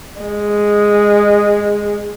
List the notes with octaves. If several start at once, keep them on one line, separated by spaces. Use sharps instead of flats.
G#3